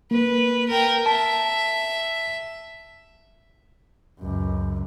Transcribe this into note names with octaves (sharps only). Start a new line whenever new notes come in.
A#3 B4
A#4 G5
E5 A5
C#2 F#2